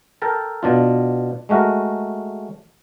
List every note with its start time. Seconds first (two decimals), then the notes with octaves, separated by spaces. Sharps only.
0.22 A4 A#4 G5 A5
0.63 B2 D4 F4
1.49 G#3 A3 F#4 A#4